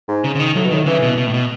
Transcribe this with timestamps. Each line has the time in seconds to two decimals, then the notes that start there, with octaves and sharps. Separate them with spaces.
0.08 G#2
0.24 C#3
0.35 C#3
0.40 D#3
0.55 A2 F#3
0.64 B2
0.71 A2 D#3
0.86 C#3 E3
1.02 B2
1.18 B2
1.27 A2
1.34 B2